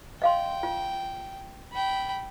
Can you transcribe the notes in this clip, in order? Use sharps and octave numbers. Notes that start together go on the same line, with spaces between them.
D#5 F5 G5 C6
F4
G5 B5